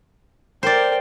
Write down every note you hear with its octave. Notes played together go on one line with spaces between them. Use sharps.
A#4 C5 D5 G5